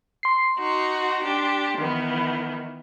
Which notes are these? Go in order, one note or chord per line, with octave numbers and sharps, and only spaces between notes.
C6 C7
D#4 F#4 A#5
D4 G4
D#3 E3 B3